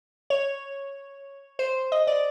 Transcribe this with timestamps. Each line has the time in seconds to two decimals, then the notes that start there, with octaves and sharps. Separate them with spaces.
0.30 C#5
1.59 C5
1.92 D#5
2.07 D5